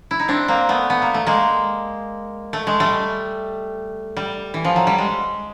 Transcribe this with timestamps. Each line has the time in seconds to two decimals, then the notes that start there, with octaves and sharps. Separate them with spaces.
0.11 E4
0.19 D#4
0.28 C4 D4
0.48 A#3 C4
0.69 A3 B3
0.90 B3
1.02 A#3
1.14 A3
1.26 G#3 A#3
2.53 A3
2.67 G#3
2.80 G3 A3
4.17 G3
4.54 E3
4.65 F3
4.76 F#3
4.87 G3
4.98 G#3